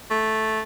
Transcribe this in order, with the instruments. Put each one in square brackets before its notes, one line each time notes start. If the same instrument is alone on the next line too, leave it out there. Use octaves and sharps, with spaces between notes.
[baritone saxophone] A3